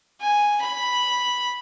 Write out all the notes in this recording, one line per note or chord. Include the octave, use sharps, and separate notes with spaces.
G#5
B5